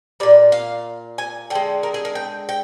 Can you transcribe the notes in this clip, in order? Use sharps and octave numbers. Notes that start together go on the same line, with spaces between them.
A#2 G3 D5
F5
G#5
D3 G#3 G5
A#4
G#4
A#4
G5
G5